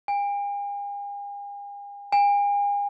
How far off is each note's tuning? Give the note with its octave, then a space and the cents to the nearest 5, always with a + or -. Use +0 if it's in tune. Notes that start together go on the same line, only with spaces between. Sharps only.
G#5 -45
G#5 -40